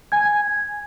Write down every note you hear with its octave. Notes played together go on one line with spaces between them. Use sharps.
G#5 G#6